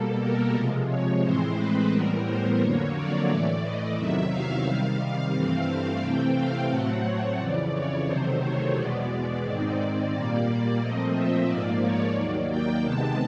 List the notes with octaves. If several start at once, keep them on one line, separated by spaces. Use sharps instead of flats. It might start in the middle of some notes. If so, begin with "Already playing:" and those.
Already playing: B2 G3 A#3 A4
A#4
C3 F3 G#3
C#5
A2 E3 G#3 C4 C5
B4
A2 E3 G3 B3 A#4
C5
F2 D3 F#3 A#3 C#5
D5
A2 E3 A3 D5
D#5
E2 C3 D#3 F#3 E5
F5
C3 D#3 G3
G2 E3 A3 C4
C3 E3 A3 C4 G5
F5
A2 F#3 A3 C4 F#5
C#5
F2 C#3 E3 D5
C#5
E2 C3 D#3 F#3 A3 C5
C#5
E2 B2 G#3 B3 D5
D5
G#2 D#3 G#3 C4
A#2 G3 A#3 D5
D5
A#2 F3 A3 C4 D#5
E5
G#2 F3 A#3 D5
C#5
D#2 D#3 F#3 A#3 D5
G5
C3 D#3 G#3 B3 A5